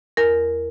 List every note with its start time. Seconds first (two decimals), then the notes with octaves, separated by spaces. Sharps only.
0.17 E2 A#4